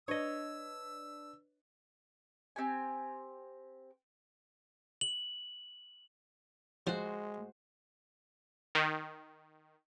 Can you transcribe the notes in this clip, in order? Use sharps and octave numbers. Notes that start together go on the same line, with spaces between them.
D4 B4 C#5 D#5 E6
C4 G4 G#5
F#7
F3 G#3 F#4 C5
D#3